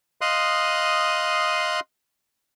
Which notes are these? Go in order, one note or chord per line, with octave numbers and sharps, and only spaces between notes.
D#5 F5 C6 D#6 F#6